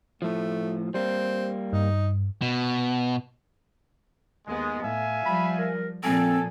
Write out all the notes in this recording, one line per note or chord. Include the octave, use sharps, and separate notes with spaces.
A2 F3 A3
G3 A#3 C4
G2 D#4
B2
D#2 G#3 B3
A2 E5 F5 G#5
F3 G3 B5
A#4
A#2 F3 C4 A4 G#5